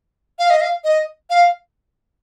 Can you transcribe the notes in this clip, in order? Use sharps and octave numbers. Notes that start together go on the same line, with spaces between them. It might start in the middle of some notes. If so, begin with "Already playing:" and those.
F5
D#5
F5
D#5
F5